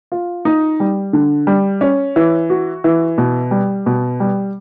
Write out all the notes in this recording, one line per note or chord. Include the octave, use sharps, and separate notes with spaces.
F4
D#4
G3
D3
G3
C#4
E3
F#4
E3
B2
G3
B2
G3